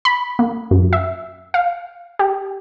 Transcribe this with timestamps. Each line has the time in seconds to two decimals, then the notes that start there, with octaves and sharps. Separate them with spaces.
0.05 B5
0.39 A#3
0.71 F#2
0.93 E5
1.54 F5
2.19 G4